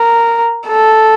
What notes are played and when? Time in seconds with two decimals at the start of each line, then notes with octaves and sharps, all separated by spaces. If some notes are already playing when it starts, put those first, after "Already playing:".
Already playing: A#4
0.68 A4